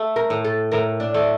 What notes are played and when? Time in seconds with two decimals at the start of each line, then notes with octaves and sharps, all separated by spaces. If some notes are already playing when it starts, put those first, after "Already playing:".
Already playing: A3
0.16 A#4
0.30 A2
0.44 A4
0.72 A2 A#4
1.00 D4
1.14 A3